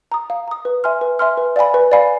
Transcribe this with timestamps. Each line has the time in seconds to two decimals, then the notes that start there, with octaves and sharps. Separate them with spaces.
0.12 A#5 D#6
0.30 F5
0.48 A#5 D#6
0.65 B4
0.84 E5 G#5 C6 F6
1.01 B4
1.19 E5 G#5 C6 F6
1.37 B4
1.56 D5 F5 G#5 B5
1.74 B4
1.92 D5 F5 G#5 B5